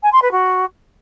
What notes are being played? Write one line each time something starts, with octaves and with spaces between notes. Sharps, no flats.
G#5
C6
B4
F#4